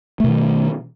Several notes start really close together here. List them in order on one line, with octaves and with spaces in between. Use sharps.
A3 B2 D#3